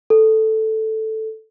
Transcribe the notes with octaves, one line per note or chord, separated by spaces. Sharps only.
A4